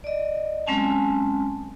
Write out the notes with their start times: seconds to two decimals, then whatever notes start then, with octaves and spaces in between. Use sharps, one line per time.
0.04 D5 D#5
0.67 F#3 G#3 C4 C#4 G#5 A5